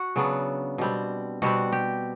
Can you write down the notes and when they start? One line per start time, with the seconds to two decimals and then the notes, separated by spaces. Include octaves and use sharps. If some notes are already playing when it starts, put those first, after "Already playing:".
Already playing: F#4
0.16 C#3 F#3 B3 D4
0.78 B2 G3 C4
1.42 B2 G3 C4 F#4
1.72 G4